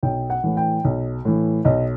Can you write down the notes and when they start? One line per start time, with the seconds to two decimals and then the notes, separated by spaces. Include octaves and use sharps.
0.03 B1 G5
0.30 F#5
0.44 A2 E3
0.57 G5
0.84 B1
1.25 A2 E3
1.65 B1 D#5